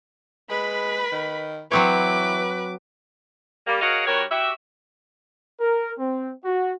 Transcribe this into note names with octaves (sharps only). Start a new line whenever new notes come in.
G#3 B4 B5
D#3
E3 F#3 C4 B4 C#5 D6
G3 A#3
F#4 G#4 A#4 C#5 D#5 F5
G2 F#4 G4 A#4 C#5
F#4 G4 E5
A#4
C4
F#4